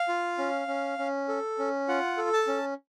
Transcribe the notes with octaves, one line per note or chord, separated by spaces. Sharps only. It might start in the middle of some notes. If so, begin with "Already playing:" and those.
Already playing: F5
F4
C#4
C#4
C#4
A4
C#4
F4 F#5
A4
A5
C#4